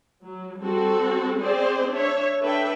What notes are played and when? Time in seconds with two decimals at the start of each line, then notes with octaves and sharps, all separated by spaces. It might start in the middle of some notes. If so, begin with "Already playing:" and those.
0.24 F#3
0.58 G3 C4 F#4 A4
1.38 C4 G#4 C5 D5 D#5
1.90 D4 C#5 E5
2.41 D4 A4 B4 E5 G5